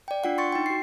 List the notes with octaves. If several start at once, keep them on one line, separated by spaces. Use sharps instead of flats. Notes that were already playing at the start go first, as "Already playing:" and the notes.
D5 G5
D4 F4 F#5
C6 C#6 A6 C#7
D#4 G5
F#4 C7